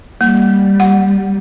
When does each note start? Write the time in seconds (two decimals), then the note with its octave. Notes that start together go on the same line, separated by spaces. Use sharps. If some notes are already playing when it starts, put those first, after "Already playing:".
0.21 G3 A#3
0.80 F#5